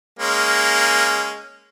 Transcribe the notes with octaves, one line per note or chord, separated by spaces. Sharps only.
G#3 A#3 C#4